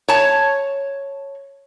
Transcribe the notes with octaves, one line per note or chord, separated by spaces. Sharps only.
C#5 A5